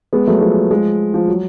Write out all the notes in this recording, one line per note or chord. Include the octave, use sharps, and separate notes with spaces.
G#3 B3
F#3 A3
F3 G#3
F3 G#3
F3
F#3